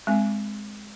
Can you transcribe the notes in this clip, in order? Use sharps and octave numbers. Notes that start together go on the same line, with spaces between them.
G#3 C4